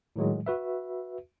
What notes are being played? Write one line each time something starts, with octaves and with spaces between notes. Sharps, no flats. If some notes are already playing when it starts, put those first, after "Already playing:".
A2 D#3 F#3 G#3
F#4 B4 E5